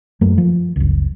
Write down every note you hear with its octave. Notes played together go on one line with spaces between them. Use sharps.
F#2 F#3 A3 A#3
F3
F#1 C#2